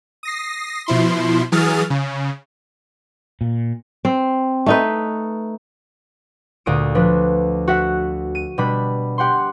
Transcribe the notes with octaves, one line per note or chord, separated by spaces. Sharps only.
D#6 A#6 C7
B2 F3 E4 C6
E3 F#3 G#4 D#6 F6 A6
C#3
A#2
C4
A3 D#4 B4
D2 A#2 D#6 D7
F3 D4 B4
F#4 E5 F#5
D#7
B2 G3 D4 B5
G4 F#5 G5 C6